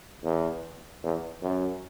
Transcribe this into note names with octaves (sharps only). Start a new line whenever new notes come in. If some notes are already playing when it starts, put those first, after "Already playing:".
E2
E2
F#2